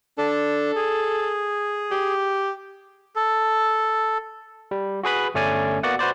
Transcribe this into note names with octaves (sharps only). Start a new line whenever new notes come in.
D4 A4
G#4
G4
A4
G3
F#4 G#4 B4 B5
G1 A3 C#4 D5 G#5
A#3 B3 F#4 D5 F#5
F#4 B4 C5 D5